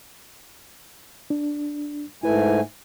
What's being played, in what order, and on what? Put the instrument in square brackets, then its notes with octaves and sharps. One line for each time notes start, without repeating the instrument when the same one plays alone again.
[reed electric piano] D4
[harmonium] G#2 A3 G#5 [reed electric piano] E4 B4